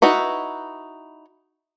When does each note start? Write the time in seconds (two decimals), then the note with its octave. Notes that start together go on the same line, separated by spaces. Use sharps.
0.02 D#4 E4 F#4 B4